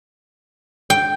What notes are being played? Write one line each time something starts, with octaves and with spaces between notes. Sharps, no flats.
G5